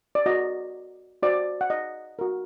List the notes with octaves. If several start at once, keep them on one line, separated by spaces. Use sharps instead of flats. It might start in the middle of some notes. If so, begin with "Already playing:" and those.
D5
F#4 A#4 D#5
F#4 C5 D5
F#5
D#5
F#4 A#4